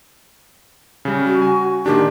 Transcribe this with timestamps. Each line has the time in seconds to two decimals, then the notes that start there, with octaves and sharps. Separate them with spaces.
1.05 C#3 G3
1.24 F#4
1.42 G#5
1.86 A#2 D#3 D4 G4